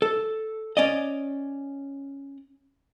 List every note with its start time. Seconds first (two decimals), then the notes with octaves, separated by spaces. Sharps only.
0.02 A4
0.77 C#4 D5 D#5